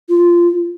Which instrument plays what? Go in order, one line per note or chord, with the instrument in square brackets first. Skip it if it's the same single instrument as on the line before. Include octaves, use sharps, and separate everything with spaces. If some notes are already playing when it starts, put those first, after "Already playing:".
[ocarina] F4